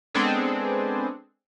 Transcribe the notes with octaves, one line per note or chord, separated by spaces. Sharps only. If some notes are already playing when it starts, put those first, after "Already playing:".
G#3 B3 C4 D4 G#4 A4